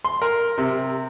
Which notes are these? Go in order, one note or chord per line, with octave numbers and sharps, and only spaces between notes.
C6
A#4
C3